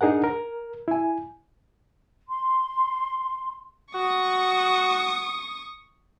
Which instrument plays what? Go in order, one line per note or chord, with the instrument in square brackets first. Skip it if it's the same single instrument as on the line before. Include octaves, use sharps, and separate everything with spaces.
[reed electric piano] D4 D#4 G#4 A#4 F#5
A#4
E4 G#5
[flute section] C6
[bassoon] F#4 [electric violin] C#6 D#6